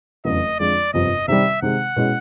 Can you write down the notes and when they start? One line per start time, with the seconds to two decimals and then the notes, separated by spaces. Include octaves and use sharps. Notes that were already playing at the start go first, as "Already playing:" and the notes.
0.25 F1 E2 C#3 F#3 D#5
0.59 F2 D3 F3 G#3 D5
0.94 G1 F2 C3 D#5
1.28 C3 D#3 G3 E5
1.62 C3 D#3 G#3 F#5
1.96 B2 G#3 C#4 E4